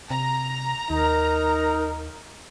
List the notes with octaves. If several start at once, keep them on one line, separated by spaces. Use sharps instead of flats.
C3 A#5
D#2 D#4 A#4